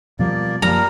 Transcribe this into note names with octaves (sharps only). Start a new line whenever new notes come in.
B2 F3 G3 A#3 D5
F#2 F3 G3 A#3 A#4 A#5